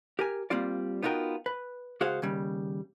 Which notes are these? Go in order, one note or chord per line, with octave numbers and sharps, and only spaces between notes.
G4 A#4 G#5
G3 A#3 C4 F4 D5
B3 D#4 F4 F#4 A#4 G5
B4
C#2 F#4 G#4 C5 F5 F#5
D#2 C#3 G3